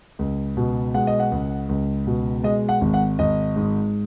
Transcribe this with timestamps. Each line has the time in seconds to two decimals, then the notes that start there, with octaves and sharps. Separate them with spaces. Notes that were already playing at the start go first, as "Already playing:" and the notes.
0.19 C#2
0.57 B2
0.94 G#3 F#5
1.07 D#5
1.20 F#5
1.32 C#2
1.69 C#2
2.07 B2
2.43 G#3 D#5
2.69 F#5
2.81 G#1
2.94 F#5
3.19 G#1 D#5
3.56 G#2